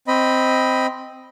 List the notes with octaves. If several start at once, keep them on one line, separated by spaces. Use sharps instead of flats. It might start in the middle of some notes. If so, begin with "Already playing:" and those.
C4 D#5 B5